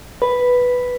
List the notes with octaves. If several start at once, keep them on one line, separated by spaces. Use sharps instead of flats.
B4